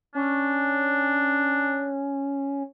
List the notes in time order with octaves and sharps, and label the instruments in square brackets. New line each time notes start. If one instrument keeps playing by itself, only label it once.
[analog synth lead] C#4 [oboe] D4